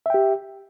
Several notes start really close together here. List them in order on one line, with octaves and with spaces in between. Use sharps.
E5 G5 G4